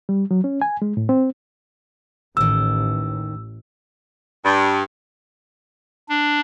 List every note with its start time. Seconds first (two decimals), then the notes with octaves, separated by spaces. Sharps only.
0.09 G3
0.31 F#3
0.44 C#4
0.62 G#5
0.82 G#3
0.97 A2
1.09 C4
2.37 A1 D#2 D#3 E6
4.45 G2
6.09 D4